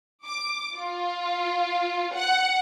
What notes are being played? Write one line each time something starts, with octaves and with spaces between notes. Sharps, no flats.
D6
F4
F#5